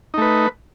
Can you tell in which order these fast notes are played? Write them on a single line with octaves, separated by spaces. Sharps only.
D#4 A3 B4